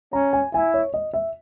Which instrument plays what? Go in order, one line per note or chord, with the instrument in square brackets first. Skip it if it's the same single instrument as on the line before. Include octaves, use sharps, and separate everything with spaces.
[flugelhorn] C#4 [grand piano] A#5
[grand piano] G#5
[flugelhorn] E4 [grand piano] G#5
[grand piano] C#5
D#5
E5